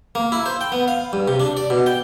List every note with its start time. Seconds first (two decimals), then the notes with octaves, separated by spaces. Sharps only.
0.15 A#3
0.32 E4
0.46 C5
0.61 G5
0.72 B3
0.88 F5
1.13 G2
1.28 C3
1.40 D4
1.57 D5
1.70 B2
1.86 G5